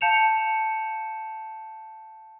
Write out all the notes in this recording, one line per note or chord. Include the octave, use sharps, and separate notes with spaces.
F5 A5 G6 C#7 E7 F7